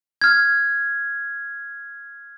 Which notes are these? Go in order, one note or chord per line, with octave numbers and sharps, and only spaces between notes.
F6 G#6